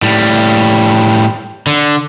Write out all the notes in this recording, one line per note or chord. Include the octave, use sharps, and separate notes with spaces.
A2 G3
D3